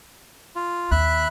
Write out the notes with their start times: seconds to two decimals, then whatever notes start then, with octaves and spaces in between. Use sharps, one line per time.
0.56 F4
0.91 D#2 D4 E5 B5 F#6